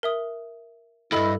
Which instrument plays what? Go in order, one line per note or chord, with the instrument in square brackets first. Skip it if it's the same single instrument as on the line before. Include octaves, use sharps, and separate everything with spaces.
[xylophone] A#4 E5 D#6
[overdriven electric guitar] C#2 G2 [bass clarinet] E4 [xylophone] A4 E6 [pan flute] D#5